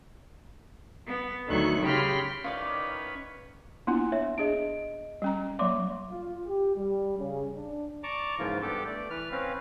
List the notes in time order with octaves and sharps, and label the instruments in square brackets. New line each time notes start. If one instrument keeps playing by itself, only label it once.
[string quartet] B3
D2 D#3 F#3 A4 C#6 F#6
C#3 G4 G5 B5 C6 F6
[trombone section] A2 D#3 [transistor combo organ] C#4 B4 [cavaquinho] F4 D5 D6
[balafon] A#3 B3 F4 [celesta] D4 E4 C6
[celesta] C#5 E5
[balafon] D4 G#4 [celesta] D#5 D7
[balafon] G3 C#4 A#5
[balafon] F#3 A#3 D5 [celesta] E5 C6 D6
[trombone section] F4
G4
G3
C#3
D4
[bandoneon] D5 A5 A#5 C#6 D6
G#2 C#3 E3 F3 A#3 F4
G2 B3 G4 A4 D6
A3 D5
E3 B4 F6
C4 C#4 B4 F5